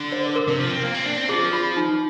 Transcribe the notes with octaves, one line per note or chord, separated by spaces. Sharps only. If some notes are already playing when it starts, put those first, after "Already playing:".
Already playing: D3
C5
A#4
C3
F3
C4
A#3
C4
D4
C4
F3 G#4
F4
D#4